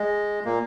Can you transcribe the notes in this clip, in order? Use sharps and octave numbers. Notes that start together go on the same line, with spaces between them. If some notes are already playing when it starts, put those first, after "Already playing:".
Already playing: G#3
A#2 A#3